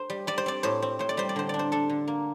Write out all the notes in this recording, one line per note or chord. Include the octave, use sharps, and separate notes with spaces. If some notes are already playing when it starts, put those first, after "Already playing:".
Already playing: C5
G3
G3 D5
C5
C4 D5
A2 C5
C4
A2 C5
D5
G3 C5
D5
D3 C5
D4 D5
C5
D4 A4
D3
A#3